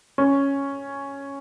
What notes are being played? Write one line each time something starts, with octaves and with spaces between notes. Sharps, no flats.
C#4